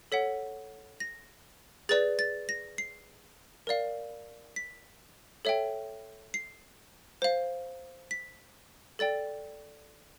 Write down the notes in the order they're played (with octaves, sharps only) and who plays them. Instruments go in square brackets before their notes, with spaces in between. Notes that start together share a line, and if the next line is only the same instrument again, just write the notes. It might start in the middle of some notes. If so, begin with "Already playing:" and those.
[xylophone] A4 C#5 F#5 B6
A#6
G#4 B4 D5 A6
A6
A#6
C7
A#4 D5 F5
B6
A4 C#5 E5 G5
C7
C5 F5
B6
A4 D5 G5 A6